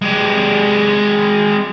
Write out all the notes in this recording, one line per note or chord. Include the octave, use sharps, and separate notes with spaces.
G#3 G4